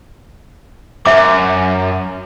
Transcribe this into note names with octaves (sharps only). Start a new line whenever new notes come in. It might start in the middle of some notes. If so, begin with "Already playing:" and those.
F#2 E5 D6